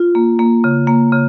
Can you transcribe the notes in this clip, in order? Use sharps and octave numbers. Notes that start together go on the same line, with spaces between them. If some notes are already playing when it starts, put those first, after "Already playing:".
Already playing: F4
A#3
A#3
C#3
A#3
C#3